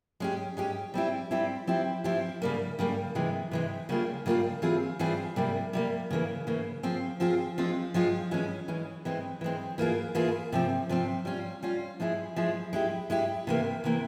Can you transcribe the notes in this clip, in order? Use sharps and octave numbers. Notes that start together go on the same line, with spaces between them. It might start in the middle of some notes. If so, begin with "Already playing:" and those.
G#3 C#4 G4
G#3 C#4 G4
G3 C4 E4 G4
G3 C4 E4 G4
F3 C4 E4 G4
F3 C4 E4 G4
C#3 G3 A#3
C#3 G3 A#3
C3 E3 G#3
C3 E3 G#3
C#3 G3 A#3 F4 G#4
C#3 G3 A#3 F4 G#4
E3 G3 C4 F4 G#4
E3 G3 C4 F4 G#4
C3 G3 A#3
C3 G3 A#3
C#3 E3 A#3
C#3 E3 A#3
F3 C4 F4 G#4
F3 C4 F4 G#4
F3 G#3 C4 F4
F3 G#3 C4 F4
E3 G#3 C#4
E3 G#3 C#4
E3 G#3 C4
E3 G#3 C4
E3 A#3 F4 G#4
E3 A#3 F4 G#4
C3 F3 C4
C3 F3 C4
G3 C#4 F4
G3 C#4 F4
F3 G#3 E4 G#4
F3 G#3 E4 G#4
G#3 E4 G4
G#3 E4 G4
C3 E3 A#3
C3 E3 A#3